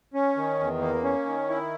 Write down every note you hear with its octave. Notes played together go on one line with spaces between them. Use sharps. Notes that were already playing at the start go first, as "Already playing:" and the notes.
C#4
D#3
E2
A#3
C#4
D#3
E4